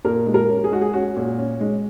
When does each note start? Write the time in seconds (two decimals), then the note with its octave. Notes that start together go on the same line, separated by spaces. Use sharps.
0.05 A#2 A#4
0.26 G#3
0.34 A#4
0.49 C#4
0.64 G#4
0.71 G#3 F#4
0.81 G#4
0.93 C#4 F#4
1.16 A#2
1.38 C#4
1.60 G#3